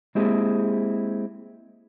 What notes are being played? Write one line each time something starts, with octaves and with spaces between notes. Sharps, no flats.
G#3 A#3 C4 E4 G4 G#4